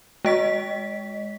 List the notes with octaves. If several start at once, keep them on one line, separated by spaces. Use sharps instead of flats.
G#3 D#5 B6